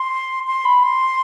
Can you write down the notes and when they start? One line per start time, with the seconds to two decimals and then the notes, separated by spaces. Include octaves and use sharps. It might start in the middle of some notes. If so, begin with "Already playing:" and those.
Already playing: C6
0.47 C6
0.65 B5
0.83 C6